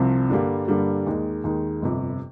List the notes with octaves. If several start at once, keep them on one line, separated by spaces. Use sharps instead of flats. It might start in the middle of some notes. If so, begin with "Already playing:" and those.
Already playing: C2 C3 F3 C4
G2 D3 G3 A#3
G2 D3 G3 A#3
D#2 D#3 G#3 D#4
D#2 D#3 G#3 D#4
G1 F2 C3